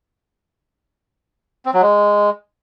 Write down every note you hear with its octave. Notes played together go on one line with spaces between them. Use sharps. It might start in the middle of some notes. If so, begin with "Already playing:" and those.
C4
F#3
G#3